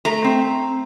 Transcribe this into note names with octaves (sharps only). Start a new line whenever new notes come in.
A3 A#5
C4